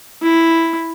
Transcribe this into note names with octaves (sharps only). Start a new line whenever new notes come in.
E4